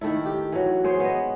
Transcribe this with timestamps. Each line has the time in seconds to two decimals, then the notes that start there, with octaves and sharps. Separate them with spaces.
0.01 D#3 A3 E4
0.25 G4
0.52 E3 F#3
0.84 G#4 C5 C#5
1.00 B3 D#5